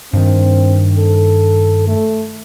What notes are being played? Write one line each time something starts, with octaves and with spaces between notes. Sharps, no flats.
G2 D#3 C4
A4
A3